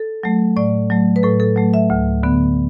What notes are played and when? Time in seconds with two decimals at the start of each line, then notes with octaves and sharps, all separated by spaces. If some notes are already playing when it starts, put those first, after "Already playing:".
Already playing: A4
0.23 F#3 A3
0.56 A2 D5
0.90 F#3 A3
1.16 B4
1.23 A2 A4
1.40 A4
1.56 F#3 A3
1.74 E5
1.90 D2
2.23 D3 B3